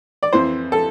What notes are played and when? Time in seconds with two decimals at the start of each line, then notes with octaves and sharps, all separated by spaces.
0.23 D5
0.33 F2 E3 C5
0.72 A4